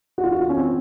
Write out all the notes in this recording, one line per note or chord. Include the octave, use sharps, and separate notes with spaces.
F#4
F4
F#4
F4
C#4
C4